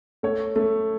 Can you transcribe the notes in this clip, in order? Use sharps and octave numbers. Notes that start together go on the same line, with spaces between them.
A3 C#5
A3